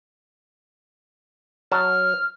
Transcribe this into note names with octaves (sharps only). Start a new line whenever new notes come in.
F#3 A5 F6